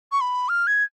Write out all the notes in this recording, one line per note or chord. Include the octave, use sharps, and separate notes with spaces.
C#6
B5
F6
G#6